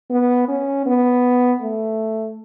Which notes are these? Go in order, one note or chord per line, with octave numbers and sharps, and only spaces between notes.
B3
C#4
B3
A3